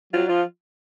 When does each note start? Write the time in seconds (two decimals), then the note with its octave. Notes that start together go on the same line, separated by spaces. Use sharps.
0.13 F#3 F4
0.29 F3 F4